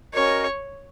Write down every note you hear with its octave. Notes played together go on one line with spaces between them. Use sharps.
C#4 F#4 A#4 C#5 D#5